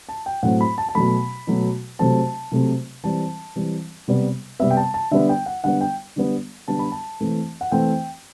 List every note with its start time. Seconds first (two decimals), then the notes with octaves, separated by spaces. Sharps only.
0.09 A5
0.26 G5
0.43 A2 F#3 A3 C4 F#5
0.61 B5
0.78 A5
0.89 A5
0.95 B2 F#3 A3 B5
1.47 B2 F#3 A3
1.99 C3 F#3 A3 C4 A5
2.52 C3 F#3 A3 C4
3.03 E3 G3 C4 A5
3.56 E3 G3 C4
4.08 C3 G3 B3
4.60 C3 G3 B3 E5
4.71 G5
4.77 A5
4.94 A5
5.11 D3 G3 B3 E5
5.29 G5
5.46 F#5
5.64 D3 G3 B3 F#5
5.81 G5
6.16 D3 G3 B3
6.68 D3 G3 B3 A5
6.79 B5
6.92 A5
7.20 E3 A3 C4
7.61 F#5
7.72 E3 A3 C4 G5